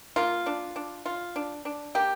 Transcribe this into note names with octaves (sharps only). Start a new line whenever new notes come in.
A#3 F4
D4
D4
F4
D4
D4
A#3 G4